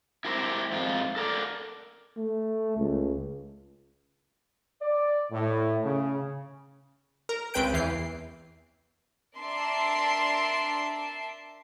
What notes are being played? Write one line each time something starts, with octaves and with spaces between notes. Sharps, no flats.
E4 G4 A#4 C5
F2 G#2 F4
A4 A#4 D5
A3
C#2
D5
A2
C#3
A#4
C#2 C4 B4 G5 G6 D7
E2 E3 C7
D4 A#4 D5 E5 A5 C6